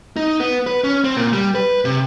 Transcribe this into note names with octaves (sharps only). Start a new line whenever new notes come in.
D#4
B3
B4
C#4
C4
A#2
G3
B4
C3